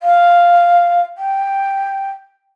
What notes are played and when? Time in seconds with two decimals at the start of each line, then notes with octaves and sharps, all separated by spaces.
0.01 F5
1.18 G5